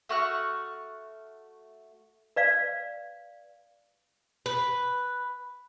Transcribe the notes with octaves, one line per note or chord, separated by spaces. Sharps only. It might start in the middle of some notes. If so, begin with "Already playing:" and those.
A3 F#4 F6 F#6
B4 D5 F5
B4